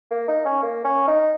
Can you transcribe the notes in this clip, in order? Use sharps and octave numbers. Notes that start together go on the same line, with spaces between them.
A#3
D#4
C#4
A#3
C#4
D#4